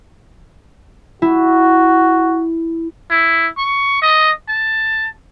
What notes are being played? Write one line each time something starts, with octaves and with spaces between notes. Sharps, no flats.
E4 F#4
E4
C#6
D#5
A5